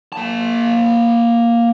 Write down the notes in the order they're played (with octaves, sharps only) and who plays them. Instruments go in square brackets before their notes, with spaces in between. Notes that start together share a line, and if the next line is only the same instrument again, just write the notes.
[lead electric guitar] A#3 A5